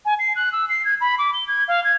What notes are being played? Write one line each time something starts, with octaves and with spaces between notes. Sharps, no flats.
G#5
C7
F#6
E6
C7
G#6
B5
D6
G7
G#6
F5
G#6